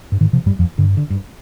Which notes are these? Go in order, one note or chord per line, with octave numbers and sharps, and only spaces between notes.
G2
G#2 D#3
C3 F3
G2 G3
F2 F3
G2 D3
D3
G2